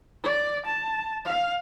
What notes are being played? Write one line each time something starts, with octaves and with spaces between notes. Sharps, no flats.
D5
A5
F5